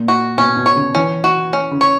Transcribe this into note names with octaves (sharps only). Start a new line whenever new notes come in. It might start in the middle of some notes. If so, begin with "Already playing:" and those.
Already playing: A#2
F#4
B2 C#4
B2
C#5
C#3
E3 C#4
F#4
C#4
C#3
C#5